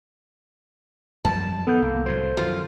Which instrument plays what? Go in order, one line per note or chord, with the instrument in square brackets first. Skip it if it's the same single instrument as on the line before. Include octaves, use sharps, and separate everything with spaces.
[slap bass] F#2 F3 G3 [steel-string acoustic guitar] A5
[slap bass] D#3 [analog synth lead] B3 [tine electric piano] A4 G6
[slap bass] C2 [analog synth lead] A#3
[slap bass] C2 A2 F#3 [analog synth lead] C5
[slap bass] F#2 D#3 F3 [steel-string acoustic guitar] F4